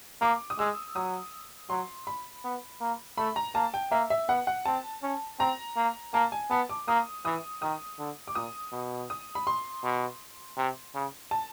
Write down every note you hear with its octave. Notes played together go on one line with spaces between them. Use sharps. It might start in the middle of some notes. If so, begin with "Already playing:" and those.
A#3 D6
D#6
G#3 E6
F#3 D#6
F#3 C6
B5
B3
A#3
A3 B5
A#5
A#3 A5
G5
A#3 E5
E5
B3 F#5
F#5
C4 A5
C#4
C4 A#5
A#3
A#3 A5
G#5
B3 A5
D6
A#3 D#6
E3 D#6
D#3 D#6
D3
D6
A#2 D#6
B2
D#6
B5
C6
B2
C3
C#3
A5